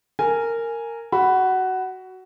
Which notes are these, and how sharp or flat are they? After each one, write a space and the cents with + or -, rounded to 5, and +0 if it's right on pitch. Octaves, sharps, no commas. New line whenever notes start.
A#4 -15 G#5 +0
F#4 +15 B5 +0